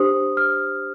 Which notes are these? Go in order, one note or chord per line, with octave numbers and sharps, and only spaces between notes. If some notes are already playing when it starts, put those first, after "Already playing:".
Already playing: D4 G4 C5 D#6
F6